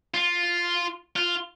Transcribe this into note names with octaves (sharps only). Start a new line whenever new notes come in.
F4
F4